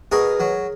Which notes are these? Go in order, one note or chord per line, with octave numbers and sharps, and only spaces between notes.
B2 G#4 A#4
F#3